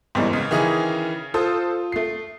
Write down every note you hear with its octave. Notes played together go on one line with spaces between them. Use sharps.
G#1 E2 G#2 E3 G3 C4
C#3
D#3 E3 G#4
F4 A4 C5 D#6
A3 C7